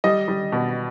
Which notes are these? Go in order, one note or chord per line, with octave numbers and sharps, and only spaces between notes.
G3 D#5
G3
B2